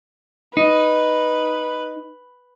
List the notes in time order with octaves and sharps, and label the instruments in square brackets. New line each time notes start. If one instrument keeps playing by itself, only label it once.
[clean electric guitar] D#4 [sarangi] B4